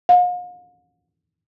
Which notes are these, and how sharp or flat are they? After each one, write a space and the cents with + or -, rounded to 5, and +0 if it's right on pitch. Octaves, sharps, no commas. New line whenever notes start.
F5 +45